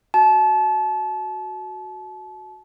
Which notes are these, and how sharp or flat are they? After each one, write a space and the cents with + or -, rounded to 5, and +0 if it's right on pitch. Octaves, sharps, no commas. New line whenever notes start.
F#4 +0 A5 -30